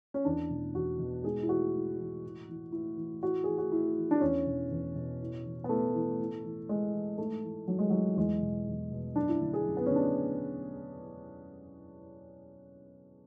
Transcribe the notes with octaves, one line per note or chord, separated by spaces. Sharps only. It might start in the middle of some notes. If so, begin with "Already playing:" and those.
C#4
E2 D4
B2
E2 F#4
B2
G#2 G#4
E4
E3 F#4
G#2
E3
A2
E3
A2 E4
E3
A2 F#4
E3 G#4
F#4
A2 E4
E3
D4
E2 C#4
B2
E2
B2
A2
E3
B3
A2 A3
E3
A2
E3
A2 G#3
E3
G#2 A3
E3
G#2 F#3
G#3
E3 F#3
E2 G#3
B2
E2
B2
F#2 D4
E4
D3
G#4
F#2
B3
D3 C#4
D4